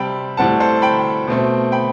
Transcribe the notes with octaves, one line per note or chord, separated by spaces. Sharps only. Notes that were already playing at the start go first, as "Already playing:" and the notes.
Already playing: C3 G3 C4 G5 A5 B5
A2 G3 C4 F#5 A5
A4 C5
G5 B5
B2 A3 C4
G5 B5